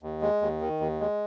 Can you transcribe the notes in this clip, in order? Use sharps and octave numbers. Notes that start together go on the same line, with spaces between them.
D#2
G#3
D#2
D#3
D#2
G#3